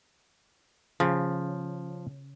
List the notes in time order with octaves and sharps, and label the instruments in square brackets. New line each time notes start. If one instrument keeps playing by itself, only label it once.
[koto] C#3 [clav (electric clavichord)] F3